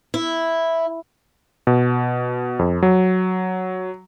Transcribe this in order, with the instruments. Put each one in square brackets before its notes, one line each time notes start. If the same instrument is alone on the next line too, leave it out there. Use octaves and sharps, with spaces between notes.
[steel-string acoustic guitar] E4
[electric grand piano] B2
F2
F#3